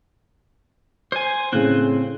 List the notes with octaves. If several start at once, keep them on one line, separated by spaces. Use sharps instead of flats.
C5 G#5
A2 C#3 C4 C5 F#6